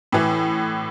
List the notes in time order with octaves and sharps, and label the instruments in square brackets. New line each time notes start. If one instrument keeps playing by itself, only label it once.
[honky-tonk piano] A2 E3